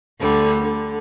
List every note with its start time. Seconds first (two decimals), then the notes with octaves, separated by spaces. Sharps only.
0.19 D2 D3 G3
0.61 D3